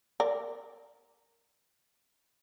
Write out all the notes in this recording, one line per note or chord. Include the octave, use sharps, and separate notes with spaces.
A#4 D5